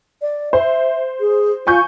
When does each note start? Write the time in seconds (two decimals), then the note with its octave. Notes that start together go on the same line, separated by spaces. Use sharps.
0.22 D5
0.53 C5 E5
1.20 G#4
1.67 F4 G#5 C#6 G6